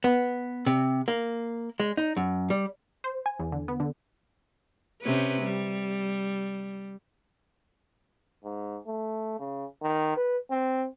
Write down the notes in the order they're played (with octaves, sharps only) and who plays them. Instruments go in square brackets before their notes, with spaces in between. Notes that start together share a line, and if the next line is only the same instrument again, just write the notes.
[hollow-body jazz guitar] B3
C3
A#3
G#3
D#4
F#2
G3
[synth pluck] C5
G#5
E2
D3
B3
D3
[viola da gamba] C3 C#4 B4
G3
[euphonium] G#2
A3
C#3
D#3
B4
C4